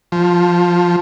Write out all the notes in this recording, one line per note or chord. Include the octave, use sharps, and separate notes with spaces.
F3